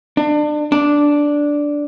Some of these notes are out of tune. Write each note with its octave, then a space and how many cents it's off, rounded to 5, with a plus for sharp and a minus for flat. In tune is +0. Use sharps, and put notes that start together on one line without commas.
D4 +30
D4 -5